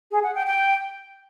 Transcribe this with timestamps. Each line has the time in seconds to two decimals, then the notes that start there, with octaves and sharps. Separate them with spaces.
0.11 G#4
0.23 F#5
0.34 G5
0.46 G5